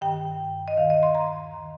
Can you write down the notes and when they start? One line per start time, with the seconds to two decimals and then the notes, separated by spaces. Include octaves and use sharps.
0.01 G2 D#3 G5
0.68 D#5
0.77 D#2 D#3 F5
0.90 D#5
1.03 C6
1.15 A#5
1.53 D#3